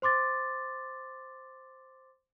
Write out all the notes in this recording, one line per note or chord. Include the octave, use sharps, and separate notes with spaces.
C5 C6 D6 A6